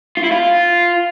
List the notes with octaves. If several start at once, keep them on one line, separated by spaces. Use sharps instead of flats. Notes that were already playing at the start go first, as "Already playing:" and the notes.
F4
E4
F4